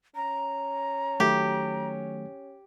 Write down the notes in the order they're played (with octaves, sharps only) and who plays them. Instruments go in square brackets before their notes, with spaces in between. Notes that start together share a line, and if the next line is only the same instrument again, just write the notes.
[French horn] C#4 [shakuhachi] A#5
[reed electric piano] D#3 F#3 A3 [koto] G4